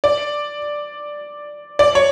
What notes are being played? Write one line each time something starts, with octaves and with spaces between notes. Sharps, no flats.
D5
D5
C#5